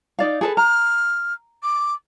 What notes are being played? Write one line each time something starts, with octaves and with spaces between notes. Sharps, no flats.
D#4 D5 F5
G#4 A4 B4
A#5 F6
D6